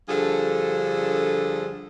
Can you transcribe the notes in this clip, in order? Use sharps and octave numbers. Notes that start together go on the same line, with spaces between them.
G2 D3 F3 F4 G#4 A4